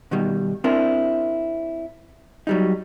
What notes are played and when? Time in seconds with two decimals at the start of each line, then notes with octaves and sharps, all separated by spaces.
0.11 B2 D#3 G3
0.64 C4 D4 E4 A#4
2.47 F#3 G3 D#4